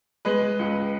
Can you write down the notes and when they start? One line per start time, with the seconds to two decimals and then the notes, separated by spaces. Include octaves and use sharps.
0.25 G#3 B4 D#5
0.42 G#3
0.59 C#2